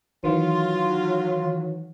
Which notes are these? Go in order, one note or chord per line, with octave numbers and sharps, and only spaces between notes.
D#3 E3 F#3 F4